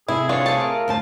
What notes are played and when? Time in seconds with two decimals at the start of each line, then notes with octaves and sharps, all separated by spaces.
0.08 C3 E4 G#4 A4
0.29 E3 D4 F4 C5 C#5
0.46 A3 A5
0.59 F4 A#4
0.88 D2 C5 A5